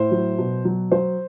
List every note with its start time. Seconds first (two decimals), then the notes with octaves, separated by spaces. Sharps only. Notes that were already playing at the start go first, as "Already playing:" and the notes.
Already playing: A2 C5
0.11 F#3
0.38 B2
0.65 F#3
0.91 F#3 C5